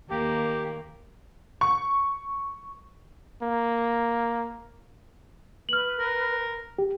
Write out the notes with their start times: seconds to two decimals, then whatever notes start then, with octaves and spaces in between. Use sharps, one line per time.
0.10 D#2 A#3 G4
1.61 C#6
3.42 A#3
5.69 B4 F6 F#7
5.99 A#4
6.79 G4